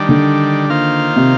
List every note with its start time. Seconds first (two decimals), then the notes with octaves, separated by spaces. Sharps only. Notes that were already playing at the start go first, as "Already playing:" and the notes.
Already playing: D#3 G3 D4
0.09 D3
0.70 D#3 A#3 F4 C5 F5
1.16 C3